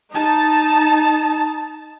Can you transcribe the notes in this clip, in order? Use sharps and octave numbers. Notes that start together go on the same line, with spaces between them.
D#4 A5